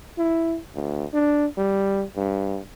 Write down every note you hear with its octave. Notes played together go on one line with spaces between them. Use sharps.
E4
D2
D4
G3
G2